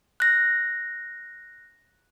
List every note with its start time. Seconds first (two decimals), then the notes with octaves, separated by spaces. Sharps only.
0.20 F#6 A#6